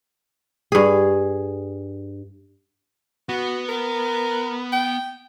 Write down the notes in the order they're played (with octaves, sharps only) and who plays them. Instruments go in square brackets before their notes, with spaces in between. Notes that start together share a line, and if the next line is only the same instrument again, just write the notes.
[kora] G2 G#4
[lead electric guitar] B3 [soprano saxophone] F#4
[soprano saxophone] A#4
G5